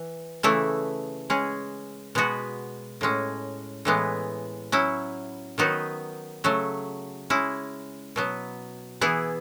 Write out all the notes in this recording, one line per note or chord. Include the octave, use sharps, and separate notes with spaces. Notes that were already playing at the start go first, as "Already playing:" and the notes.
Already playing: E3
C#3 E3 A3 E4
G#3 C#4 G#4
B2 G#3 B3 F#4
A2 G#3 C#4
A2 E3 G#3 B3
F#3 C#4 E4
D#3 F#3 B3 D#4 F#4
C#3 F#3 A3
G#3 C#4 E4
B2 F#3 B3
E3 B3 E4 G#4